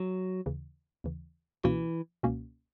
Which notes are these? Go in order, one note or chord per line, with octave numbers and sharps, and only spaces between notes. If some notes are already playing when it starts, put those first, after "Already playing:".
Already playing: F#3
D#2 C#3 E3
D#2 C#3 E3
C#2 B2 E3 A#3 C#4 F#4
C#2 B2 A#3 C#4 F#4